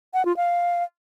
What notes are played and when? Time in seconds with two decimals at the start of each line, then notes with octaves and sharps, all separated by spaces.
0.14 F#5
0.25 F4
0.37 F5